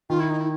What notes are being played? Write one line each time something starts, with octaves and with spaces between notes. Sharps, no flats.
D#3 F4
E4
D#4
E4